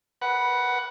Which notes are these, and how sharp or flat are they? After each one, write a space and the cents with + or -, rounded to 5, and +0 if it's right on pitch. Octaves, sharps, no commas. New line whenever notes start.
B4 -15 F#5 +10